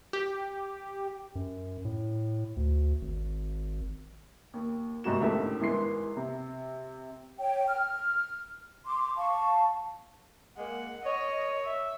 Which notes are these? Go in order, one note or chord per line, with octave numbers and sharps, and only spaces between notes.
G4
F#2
A2
D2
G#1
D#2
F#1 G#2 C3 F#4 E7
C#2 A2 D3 D#3 G4 E5
G#1 E2 G#3 E4 C6 C7
C3
C#5 G5
F6
C6 D6
F5 A5 C#6
G#3 A#3 F#5
A#4 C#5 D#5
E5